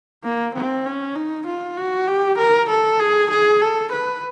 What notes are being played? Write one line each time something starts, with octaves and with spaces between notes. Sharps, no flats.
A#3
C4
C#4
D#4
F4
F#4
G4
A#4
A4
G#4
G#4
A4
B4